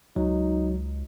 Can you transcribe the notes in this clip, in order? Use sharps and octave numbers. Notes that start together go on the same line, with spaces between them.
C#2 F#3 D#4